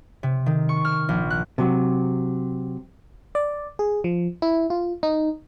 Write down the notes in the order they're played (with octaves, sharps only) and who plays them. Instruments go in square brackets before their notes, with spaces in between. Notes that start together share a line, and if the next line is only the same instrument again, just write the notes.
[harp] C3
D#3
C#6
F6
A#1
F#6
[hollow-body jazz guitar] C3 F#3
[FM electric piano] D5
G#4
F3
E4
F4
D#4